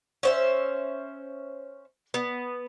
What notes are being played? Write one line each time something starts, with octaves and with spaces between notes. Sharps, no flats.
C#4 C5 E5
B3